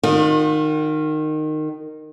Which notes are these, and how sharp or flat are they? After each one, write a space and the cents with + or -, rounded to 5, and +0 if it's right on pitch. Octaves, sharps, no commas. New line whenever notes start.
D#3 -15 F4 +40